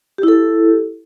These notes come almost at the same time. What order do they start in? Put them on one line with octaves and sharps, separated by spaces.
G4 E4 A4